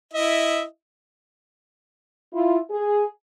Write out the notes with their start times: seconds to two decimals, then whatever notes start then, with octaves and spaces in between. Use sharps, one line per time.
0.13 E4 D#5 E5
2.33 E4 F4
2.70 G#4